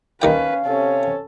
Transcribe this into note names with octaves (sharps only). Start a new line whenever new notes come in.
D#2 D#3 C#4 B4 F5 G5
C3 C#4 A4 C#5